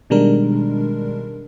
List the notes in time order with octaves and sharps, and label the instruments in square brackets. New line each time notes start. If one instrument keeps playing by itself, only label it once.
[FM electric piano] B2 D#3 G3 G#3 D4 A#4